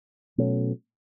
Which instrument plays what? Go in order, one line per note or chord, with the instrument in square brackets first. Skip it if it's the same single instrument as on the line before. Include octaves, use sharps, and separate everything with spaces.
[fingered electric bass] B2 F#3 A3 C#4